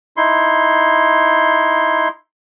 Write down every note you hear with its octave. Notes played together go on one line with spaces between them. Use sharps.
D#4 E4 C6